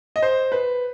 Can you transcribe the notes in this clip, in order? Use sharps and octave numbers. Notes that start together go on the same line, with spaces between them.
D#5
C5
B4